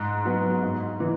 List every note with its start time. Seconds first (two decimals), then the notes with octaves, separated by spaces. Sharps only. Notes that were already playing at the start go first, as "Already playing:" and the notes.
Already playing: G#2
0.25 F#3 B3
0.63 G#2
1.00 E3